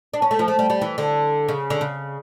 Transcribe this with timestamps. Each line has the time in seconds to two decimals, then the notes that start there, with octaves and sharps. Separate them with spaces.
0.14 D4
0.22 C#4
0.31 A3
0.39 F3
0.48 A3
0.59 G3
0.70 G3
0.81 E3
0.98 D3
1.49 C#3
1.70 D3
1.81 C#3